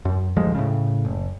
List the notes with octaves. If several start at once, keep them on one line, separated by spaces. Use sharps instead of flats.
F#2
A1 D2 F3 G#3
A2 C#3
F#1